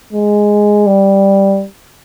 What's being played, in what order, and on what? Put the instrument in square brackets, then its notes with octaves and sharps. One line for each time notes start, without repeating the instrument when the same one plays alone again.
[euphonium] G#3
G3